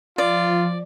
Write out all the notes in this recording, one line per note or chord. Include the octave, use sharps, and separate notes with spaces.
F3 F4 D5